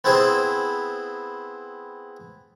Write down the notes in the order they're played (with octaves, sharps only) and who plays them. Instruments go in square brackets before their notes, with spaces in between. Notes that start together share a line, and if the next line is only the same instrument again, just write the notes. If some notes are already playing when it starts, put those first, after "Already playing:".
[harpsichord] B3 C4 E4 G#4 C5